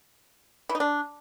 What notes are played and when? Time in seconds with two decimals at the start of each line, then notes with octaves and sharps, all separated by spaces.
0.69 E3
0.75 D#4
0.80 D4